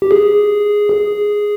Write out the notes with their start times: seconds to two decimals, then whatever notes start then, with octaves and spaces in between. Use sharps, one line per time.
0.02 G4
0.11 G#4
0.92 G#4